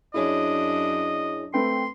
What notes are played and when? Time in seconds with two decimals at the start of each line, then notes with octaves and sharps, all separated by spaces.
0.14 F#2 D4 E4 G#4 C#5 D#5
1.54 A3 C4 B4 G5 C6